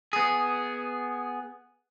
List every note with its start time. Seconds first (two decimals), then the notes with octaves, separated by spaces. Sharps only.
0.13 B3 G#4